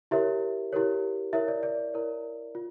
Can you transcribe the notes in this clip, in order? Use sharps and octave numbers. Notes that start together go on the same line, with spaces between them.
E4 G4 A#4 C#5 E5
E4 G4 A#4 C#5
E4 A#4 C#5 E5
D5
D5
E4 A#4 C#5
F4